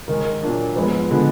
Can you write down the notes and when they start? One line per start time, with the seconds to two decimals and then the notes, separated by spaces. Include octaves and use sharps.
0.08 D#3 G#3 D#4 G#4 A#4
0.43 A#2 F#3 A#3 D4
0.76 G#2 F3 G#3 B3 B4
1.09 D3 F3 G#3 B3